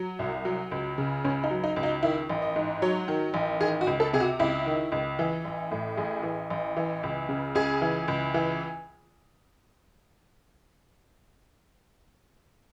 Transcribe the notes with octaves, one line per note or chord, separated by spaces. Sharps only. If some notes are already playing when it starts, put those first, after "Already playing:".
Already playing: F#3
C2
F#3
C#2
C#3
C#2 C#4
D#4
F#3
D#4
C#2
D#4
D#3 E4
A1
D#5
G#2
F#3 C#5
D#3
A1
D#3 G#4
F#4
C#2
A4
C3 G#4
F#4
C#2 E4
D#3
C#2
E3
A1
A2
A1 G#4
E3
A1
E3
C#2
C#3
C#2 G#4
E3
C#2
E3